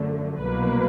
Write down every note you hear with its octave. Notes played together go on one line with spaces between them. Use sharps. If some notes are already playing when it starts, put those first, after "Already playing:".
Already playing: F#2 D3 F3 A3
C2 B2 F#3 A#3 B4